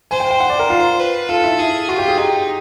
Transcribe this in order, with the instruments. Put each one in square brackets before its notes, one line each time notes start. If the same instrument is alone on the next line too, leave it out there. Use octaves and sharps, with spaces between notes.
[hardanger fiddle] C5 [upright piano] G#5
[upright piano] G5
G5
F#5
D5
A#4
F4
[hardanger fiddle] B4
[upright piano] F4 [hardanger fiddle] A4
[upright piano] E4
[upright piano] E4 [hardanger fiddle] G#4
[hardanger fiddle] F4 [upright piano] F#4
[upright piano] G4
G#4
[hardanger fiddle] D#4 [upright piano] G4